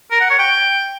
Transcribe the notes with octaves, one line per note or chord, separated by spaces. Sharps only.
A#4
F#5
C#5
G5